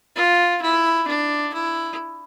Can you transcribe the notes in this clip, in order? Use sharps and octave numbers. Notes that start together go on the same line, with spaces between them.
F4
E4
D4
E4